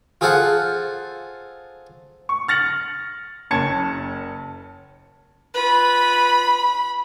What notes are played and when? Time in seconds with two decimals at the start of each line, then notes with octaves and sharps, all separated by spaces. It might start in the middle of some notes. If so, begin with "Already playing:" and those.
0.21 F4 G#4 A4 C5 F5 F#5
2.29 C#6
2.48 F6 A6 A#6 C#7 F#7
3.51 F#1 C#4 A5 G#6 C#7
5.54 F4 B4 B5